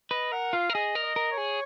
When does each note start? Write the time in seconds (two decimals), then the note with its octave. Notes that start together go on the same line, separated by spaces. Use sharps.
0.10 B4 D#5
0.32 A#4 F#5
0.53 F4 F5
0.70 A#4
0.74 G#4 D#5
0.95 A#4
1.03 D#5
1.16 A#4
1.32 C#5
1.38 G#4